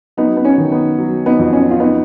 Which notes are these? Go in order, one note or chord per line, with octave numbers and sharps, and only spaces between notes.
F#3 B3 D#4
B3
C#4
D#3
B3 D#4
F#3
B3 D#4
F2
C#4
F4
B3 D#4